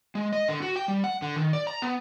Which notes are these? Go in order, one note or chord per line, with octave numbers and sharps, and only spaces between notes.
G#3
D#5
D3
F#4
G5
G3
F#5
D3
D#3
D5
A#5
B3